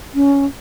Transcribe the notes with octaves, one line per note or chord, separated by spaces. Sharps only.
C#4